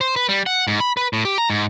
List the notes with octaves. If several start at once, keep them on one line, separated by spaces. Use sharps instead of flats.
C5
B4
G3
F#5
G#2
B5
B4
A2
G4
A#5
G#2